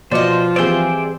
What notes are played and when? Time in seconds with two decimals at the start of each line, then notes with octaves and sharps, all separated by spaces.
0.11 B2 F3 C5 D5 D#5 D6 C#7
0.56 E3 G3 C4 G#4 C5 D5 E5 G5